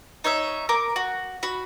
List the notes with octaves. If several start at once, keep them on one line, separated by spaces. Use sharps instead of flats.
D#4 C#5 E5
A#4 D6
F#4
F#4 B5